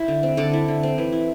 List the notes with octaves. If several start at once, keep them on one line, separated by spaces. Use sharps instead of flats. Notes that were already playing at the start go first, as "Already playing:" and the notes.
Already playing: E4 C5 E5
D3
C4
D3 A4 D5
E4
D3
C4
E3
E4